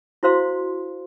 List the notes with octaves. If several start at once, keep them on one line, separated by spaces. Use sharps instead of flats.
E4 F#4 C5 F5 C6